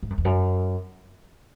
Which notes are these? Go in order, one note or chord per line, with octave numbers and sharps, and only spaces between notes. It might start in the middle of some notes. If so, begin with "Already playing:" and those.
G#2
F#2
E2
F#2